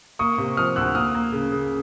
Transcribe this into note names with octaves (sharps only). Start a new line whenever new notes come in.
A#3 C#6 D#6
C3
F3 D#6 F6
D2 E6 F#6
A#3 D#6 F6
A#3
C#3
C#3